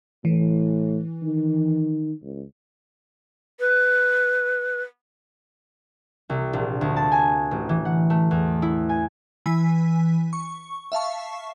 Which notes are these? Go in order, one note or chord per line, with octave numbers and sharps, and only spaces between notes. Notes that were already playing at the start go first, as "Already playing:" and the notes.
A2 E3
D#3
C#2
B4
C2
A#1
D2
A5
G#5
A1
E3
F#5
A3
E2
E4
G#5
E3 G#5 B6
C#6
E5 F5 A5 C#6